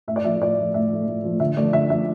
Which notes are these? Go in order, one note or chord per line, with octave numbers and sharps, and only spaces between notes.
A2 E5
D5
F3 A3 E5
A2 D5
F3 A3
A2 E5
F3 A3
A2
F3 A3
D3 E5
F3 A3 D5
D3 E5
F3 A3 E5